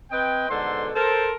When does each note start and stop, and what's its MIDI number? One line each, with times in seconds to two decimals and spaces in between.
0.11 0.46 60
0.11 0.46 71
0.11 0.46 75
0.11 0.46 79
0.50 0.90 44
0.50 0.90 47
0.50 0.90 50
0.50 0.90 69
0.50 0.90 72
0.50 0.90 84
0.95 1.34 69
0.95 1.34 70
0.95 1.34 72